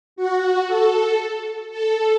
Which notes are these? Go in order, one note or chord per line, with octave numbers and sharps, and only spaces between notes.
F#4
A4
A4